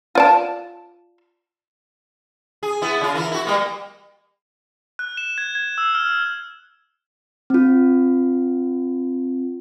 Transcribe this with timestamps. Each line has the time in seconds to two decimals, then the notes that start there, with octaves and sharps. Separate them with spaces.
0.15 F4 D5 A5
2.63 G#4
2.82 B3 E4
3.01 C#3 F4
3.14 E3 E4 A#4
3.31 E4 F#4
3.45 G3 A#3 B3
4.99 F#6
5.17 E7
5.38 G#6
5.55 G#6
5.78 E6
5.95 F6
7.50 C4 F4